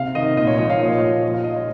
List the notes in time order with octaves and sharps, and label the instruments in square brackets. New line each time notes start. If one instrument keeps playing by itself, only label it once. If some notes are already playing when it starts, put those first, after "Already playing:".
Already playing: [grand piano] C3 F5
D#3 D#5
A#2 D#5
C#5
F3 C#5
F5
A#2 D#5
C#5
F3 D#5
A#2 C#5
F5
F3 D#5
C#5